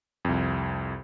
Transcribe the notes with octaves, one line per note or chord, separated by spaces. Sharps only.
C2 F2